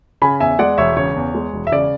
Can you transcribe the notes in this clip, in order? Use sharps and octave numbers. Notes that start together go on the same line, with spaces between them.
C#3 G#5 B5
E2 E5 G#5
G#3 D5 F#5
E1 C#5 E5
C#3 C#5
E2
G#3
E1
E5
C#3 D5